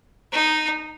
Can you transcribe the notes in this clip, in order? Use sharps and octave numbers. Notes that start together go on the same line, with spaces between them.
D#4